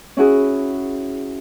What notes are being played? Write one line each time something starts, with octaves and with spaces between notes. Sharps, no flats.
C#4 E4 F#4 G#4